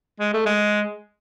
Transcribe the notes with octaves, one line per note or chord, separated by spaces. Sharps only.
G#3
A3
G#3